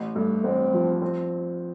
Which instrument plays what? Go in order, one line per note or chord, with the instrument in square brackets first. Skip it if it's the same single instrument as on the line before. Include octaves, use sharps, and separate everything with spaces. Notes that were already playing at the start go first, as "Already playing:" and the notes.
Already playing: [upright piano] A1
[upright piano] G2 [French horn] A3
[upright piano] A1 [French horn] C4
[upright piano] F3
C4